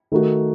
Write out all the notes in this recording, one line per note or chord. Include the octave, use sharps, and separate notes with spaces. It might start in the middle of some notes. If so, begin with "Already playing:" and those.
D#3 A3 D#4 F#4